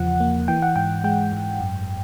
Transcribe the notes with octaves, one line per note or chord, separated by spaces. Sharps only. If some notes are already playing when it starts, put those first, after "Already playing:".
Already playing: E2 C#3 F3 F#5
A#3
E3 G5
F#5
G#2 G5
G#3 G5
G#2
F#2